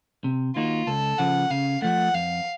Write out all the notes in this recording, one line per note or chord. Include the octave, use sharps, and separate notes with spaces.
C3
D#3 A#3 D#4 F4 F#4
C#2 A4
C#3 F3 F#5
C#3 F5
F3 A3 F#5
F2 F5